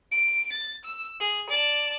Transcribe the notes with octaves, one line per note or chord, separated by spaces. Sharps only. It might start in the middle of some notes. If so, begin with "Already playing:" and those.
D7
A6
E6
G#4
D5 A5